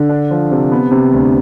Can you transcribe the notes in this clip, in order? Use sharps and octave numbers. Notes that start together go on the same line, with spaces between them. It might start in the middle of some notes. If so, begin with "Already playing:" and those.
Already playing: D3
D4
F3
C3
B3
C3
D2